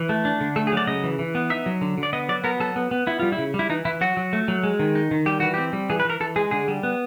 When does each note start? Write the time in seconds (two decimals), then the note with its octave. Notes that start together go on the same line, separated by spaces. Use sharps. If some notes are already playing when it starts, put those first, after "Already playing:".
Already playing: E3
0.09 A3
0.25 D4
0.41 D3
0.56 A3 A4
0.67 G#4
0.72 F#3
0.77 D5
0.87 C#3 D#5
1.03 E3
1.19 E3
1.35 B3
1.50 D#4 E5
1.66 F#3
1.81 D3
1.98 D3
2.03 D5
2.13 B3 D#5
2.29 F#3 D5
2.44 B3 A#4
2.60 F#3 A4
2.76 B3
2.91 B3
3.07 B3 E4
3.20 G3 F4
3.32 E4
3.38 C#3
3.54 G3
3.59 E4
3.70 E3 D#4
3.85 E3 E4
4.01 F#3 F#4
4.17 F#3
4.33 A3
4.48 F#3
4.63 G#3
4.79 D#3
4.95 D#4
5.11 D#3
5.26 G3 G4
5.40 E3 F#4
5.54 C4 G4
5.73 G3
5.90 E3 G#4
6.00 B4
6.05 E3 A#4
6.20 E3 A4
6.36 G#3 G#4
6.51 D3 G#4
6.68 G3
6.83 B3